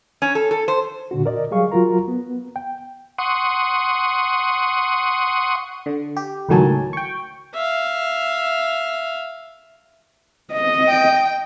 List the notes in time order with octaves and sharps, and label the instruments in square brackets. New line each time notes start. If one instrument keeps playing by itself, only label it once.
[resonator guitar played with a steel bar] C#4
A4
A4
C5
[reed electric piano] A#2 D3 D4 F#4
A#4 D5 D#5
F#3 G3 G#4 F5 C#6
F#3 F4 F#4 A#4 A#5
B3
G5
[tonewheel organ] F#5 C6 C#6 D#6
[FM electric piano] D3
G4
C#2 A2 D#3 F#3 G#5 A5
G5 C#6
[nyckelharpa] E5 F5
[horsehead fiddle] D#5
[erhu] G5